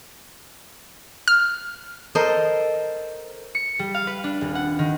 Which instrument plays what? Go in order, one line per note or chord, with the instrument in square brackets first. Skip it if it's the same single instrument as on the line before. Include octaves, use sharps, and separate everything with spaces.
[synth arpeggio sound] F6
[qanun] A4 A#4 C5 D#5
[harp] C#7
G3
F5
B4
D4
D#1
F#5
D#3